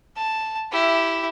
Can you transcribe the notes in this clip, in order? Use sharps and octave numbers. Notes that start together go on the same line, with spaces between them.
A5
E4 G4